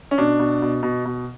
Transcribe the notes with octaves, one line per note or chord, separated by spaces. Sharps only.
C#4
B2 D4
B2
B2
B2
B2